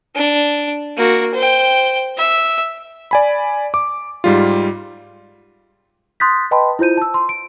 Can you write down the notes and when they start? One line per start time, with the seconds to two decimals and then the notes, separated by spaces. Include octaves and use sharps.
0.16 D4
0.97 A#3 F#4
1.34 C5 G5
2.18 E5
3.11 D5 G#5 B5
3.74 D6
4.24 G#2 G3 F4
6.20 C6 D#6 F#6 G6 A6 B6
6.51 B4 D#5 G5 A5 B5 C6
6.79 E4 F4 C5 G6 D#7
6.97 A5 E6
7.14 C6
7.29 D7